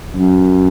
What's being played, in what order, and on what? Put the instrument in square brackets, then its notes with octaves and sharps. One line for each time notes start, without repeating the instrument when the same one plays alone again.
[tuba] F#2